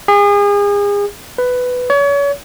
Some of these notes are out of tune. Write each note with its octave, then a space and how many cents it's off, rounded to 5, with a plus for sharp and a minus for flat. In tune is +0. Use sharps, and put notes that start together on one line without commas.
G#4 -35
B4 +10
C#5 +35